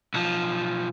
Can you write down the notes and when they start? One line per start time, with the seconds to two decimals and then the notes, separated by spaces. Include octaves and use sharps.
0.14 B1 F3